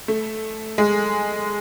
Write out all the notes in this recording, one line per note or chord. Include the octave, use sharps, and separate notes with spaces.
A3
G#3